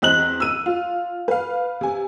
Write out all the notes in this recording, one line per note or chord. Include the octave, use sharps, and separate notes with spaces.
E2 C4 D#5 F#6 F#7
E6 D#7
F4
B4 F5
C3 G#5